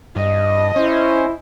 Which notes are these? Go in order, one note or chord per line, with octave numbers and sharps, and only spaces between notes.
G2 D#5
C#4 E4 C5